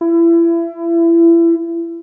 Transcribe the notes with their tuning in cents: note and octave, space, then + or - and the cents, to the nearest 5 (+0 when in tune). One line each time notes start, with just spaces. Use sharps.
E4 +30